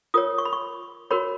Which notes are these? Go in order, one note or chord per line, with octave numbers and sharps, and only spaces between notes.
F4 A#4 C#5 D#6
C#6
B5
C#6
F#4 A#4 C#5 B5